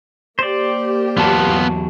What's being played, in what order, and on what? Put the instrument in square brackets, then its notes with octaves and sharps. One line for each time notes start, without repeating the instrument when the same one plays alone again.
[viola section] A#3 G4 [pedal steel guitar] C5 D5
[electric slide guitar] E2 F#3 A5 [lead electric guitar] B3 F4